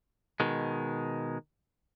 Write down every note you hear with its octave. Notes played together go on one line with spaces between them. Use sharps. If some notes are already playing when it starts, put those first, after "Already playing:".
B2 D#3 G#3